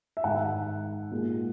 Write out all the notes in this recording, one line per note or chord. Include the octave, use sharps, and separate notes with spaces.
E5
G#2 D#3 G#3 F#5
A#2 G#3